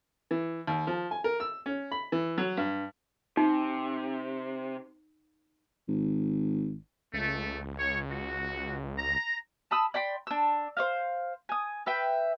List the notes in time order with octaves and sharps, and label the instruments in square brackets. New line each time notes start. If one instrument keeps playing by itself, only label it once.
[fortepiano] E3
D#2
F3
G#5
A#4
E6
C#4
B5
E3
F#3
G2
[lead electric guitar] C3 [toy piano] D#4
[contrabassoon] G#1
[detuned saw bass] C#2 [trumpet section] A3
[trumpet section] C#5
F#4
A#5
[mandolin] A5 B5 D#6 E6
D5 G5 B5 C6
D4 E6
C5 D#5 F5
G#5 D#6
B4 E5 G5